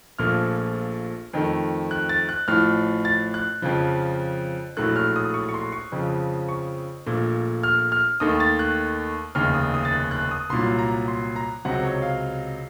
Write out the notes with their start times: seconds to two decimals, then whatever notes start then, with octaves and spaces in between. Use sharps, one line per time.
0.18 A#1 A#2 F3 A3 F6
1.33 F2 D#3 A3
1.91 F#6
2.09 A6
2.29 F#6
2.48 A1 A2 F3 F6
3.05 A6
3.34 F#6
3.62 F2 C#3 F3
4.77 A#1 A2 F#3 A3 F#6
4.96 F6
5.16 D#6
5.34 C#6
5.49 C#6
5.54 C6
5.72 C#6
5.92 F2 C#3 F3
6.49 C#6
7.07 A#1 A#2 A3
7.63 F6
7.92 F6
8.20 D#2 D#3 A3 D#6
8.40 A6
8.59 F#6
9.35 F1 D#2 C#3 F6
9.54 D#6
9.74 D#6
9.85 A6
9.93 F#6
10.11 F#6
10.31 D#6
10.49 C2 A#2 F#3 C6
10.79 A#5
11.08 C6
11.36 A#5
11.65 C#2 C3 F#3 F#5
11.83 C#5
12.02 F5